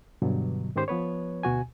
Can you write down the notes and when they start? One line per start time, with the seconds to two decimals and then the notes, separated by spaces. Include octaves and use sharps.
0.22 G2 B2 D3 F#3
0.76 G#2 D#3 C#4 G4 C5
0.88 F3 B3 B4 C#5
1.43 D2 B2 F#4 G#5